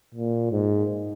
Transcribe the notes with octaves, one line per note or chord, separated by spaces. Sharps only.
A#2
G#2